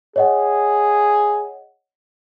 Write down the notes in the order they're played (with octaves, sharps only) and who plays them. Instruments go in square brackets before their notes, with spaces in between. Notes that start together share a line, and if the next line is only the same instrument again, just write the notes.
[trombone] G#4 [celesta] C#5 D#5 F#5